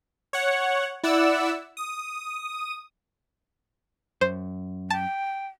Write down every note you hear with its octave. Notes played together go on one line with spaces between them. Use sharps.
C#5 F#5
E4 D5 F#5 E6
D#6
F#2 C5
G5 A5